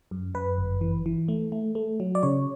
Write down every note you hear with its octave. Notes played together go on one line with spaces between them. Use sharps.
F#2
F#2 B4
G1
E3
E3
A3
A3
A3
F#3
D5
C#3 C#5